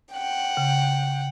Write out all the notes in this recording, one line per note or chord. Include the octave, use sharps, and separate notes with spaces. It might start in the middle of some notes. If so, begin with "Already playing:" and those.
F#5 G5
C#3